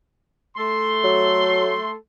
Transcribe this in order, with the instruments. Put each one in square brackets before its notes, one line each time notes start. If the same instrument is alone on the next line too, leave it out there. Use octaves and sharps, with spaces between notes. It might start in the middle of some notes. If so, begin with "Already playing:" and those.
[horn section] A3 A4 C6
[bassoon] F#3